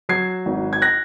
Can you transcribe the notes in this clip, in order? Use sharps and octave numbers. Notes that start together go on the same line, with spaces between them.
F#3 G#6 C7
G#1
G#6
F#6 A#6